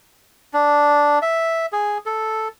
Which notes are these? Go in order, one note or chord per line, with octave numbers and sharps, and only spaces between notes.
D4
E5
G#4
A4